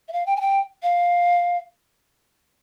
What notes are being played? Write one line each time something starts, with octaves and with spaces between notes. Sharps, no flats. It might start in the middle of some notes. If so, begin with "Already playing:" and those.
E5
F5
G5
G#5
G5
F5